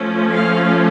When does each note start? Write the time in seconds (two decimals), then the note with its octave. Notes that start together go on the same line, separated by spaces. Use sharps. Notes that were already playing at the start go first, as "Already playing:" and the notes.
Already playing: F3 A3 C#4
0.33 F5